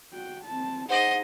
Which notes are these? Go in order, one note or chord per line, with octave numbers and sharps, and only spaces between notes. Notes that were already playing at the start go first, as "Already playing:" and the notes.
F#4 G5
C4 A5
D#4 G#4 C5 D#5 F#5